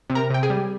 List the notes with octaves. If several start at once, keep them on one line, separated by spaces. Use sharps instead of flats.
C3
A#4 A#5
C3 G5
G#4 G#5
G3